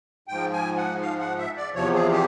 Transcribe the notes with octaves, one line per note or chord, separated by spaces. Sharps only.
G#2 F3 G5
G#5
F#5
F5
F#5
E5
D5
E2 C3 F3 C#5
G#4
G4